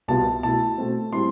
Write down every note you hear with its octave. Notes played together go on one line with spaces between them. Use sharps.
C2 B2 G3 B3 F4 A5
B2 A3 E4 A5
B2 A3 C4
A2 G3 C4 E4 C6